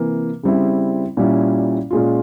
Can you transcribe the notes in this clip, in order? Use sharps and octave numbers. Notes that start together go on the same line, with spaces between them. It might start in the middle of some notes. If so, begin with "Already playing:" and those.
Already playing: C3 E3 A#3
C#3 G3 C4 E4
A#2 G3 C#4 E4
A#2 G#3 C#4 F4